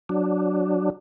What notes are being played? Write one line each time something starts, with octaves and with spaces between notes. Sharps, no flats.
F#3 D4